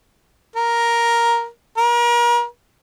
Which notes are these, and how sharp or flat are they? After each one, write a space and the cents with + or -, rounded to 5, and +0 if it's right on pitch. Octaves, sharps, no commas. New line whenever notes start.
A#4 +5
A#4 +40